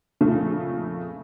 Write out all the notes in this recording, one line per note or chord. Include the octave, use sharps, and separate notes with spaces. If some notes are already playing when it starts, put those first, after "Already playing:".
F2 A#2 C#3 A3